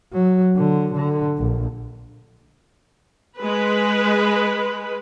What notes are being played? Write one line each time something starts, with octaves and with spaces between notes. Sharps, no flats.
F#3
D3
D3
A#1
G#3 B4